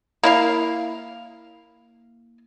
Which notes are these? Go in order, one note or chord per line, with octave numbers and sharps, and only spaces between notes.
A#3 E4 F5